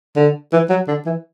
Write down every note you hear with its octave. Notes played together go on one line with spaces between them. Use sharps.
D3
E3
F#3
D3
E3